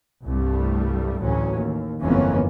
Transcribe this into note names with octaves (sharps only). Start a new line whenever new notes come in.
C2 G2 G3 A3
A1 D2 F#3 C#4
D#2
G1 F2 E3 A#3 B3 C#4